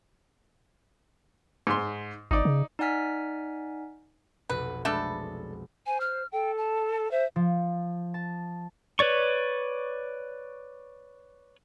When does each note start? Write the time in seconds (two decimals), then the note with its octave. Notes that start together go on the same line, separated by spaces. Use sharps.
1.67 G#2 C6
2.31 G#1 D#4 D5
2.45 C#3
2.79 D#4 D5 F#5 G#5 F6 B6
4.49 F1 B1 F#4 B4
4.85 G#3 A3 D4 A4 B4
5.86 C5 G#5
6.00 F6
6.32 A4 G5
6.58 A5
7.11 C5 E5
7.36 F3
8.14 A5
8.99 B4 C#5 D5 C#6